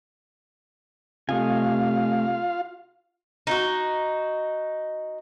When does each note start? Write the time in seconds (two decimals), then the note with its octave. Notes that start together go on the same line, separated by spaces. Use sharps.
1.29 C3 A3 F4 D#5 F5 G#5
3.47 D#4 E4 F#4